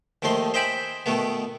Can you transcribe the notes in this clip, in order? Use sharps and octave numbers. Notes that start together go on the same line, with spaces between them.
D#2 D#3 F3 A3 D#5 C6
C5 D#5 E5 G5 G#5 B5
B2 D#3 A3 B3